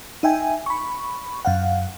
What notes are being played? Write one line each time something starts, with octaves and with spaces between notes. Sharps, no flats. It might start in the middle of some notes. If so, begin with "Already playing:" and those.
D#4 E5 G5 G#5
B5 C#6
F#2 F5 F#5